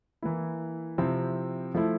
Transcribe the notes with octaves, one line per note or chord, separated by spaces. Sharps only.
E3 A#3 E4
C3 F3 C4 E4
F3 A3 E4